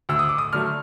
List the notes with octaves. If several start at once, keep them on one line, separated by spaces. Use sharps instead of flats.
D2 E6
D#6
D6
D#6
D3 F#3 A3 F6